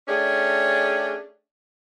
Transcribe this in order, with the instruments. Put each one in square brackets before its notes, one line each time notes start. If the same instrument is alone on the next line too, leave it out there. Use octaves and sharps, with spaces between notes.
[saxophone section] A3 C#4 D4 G4 G#4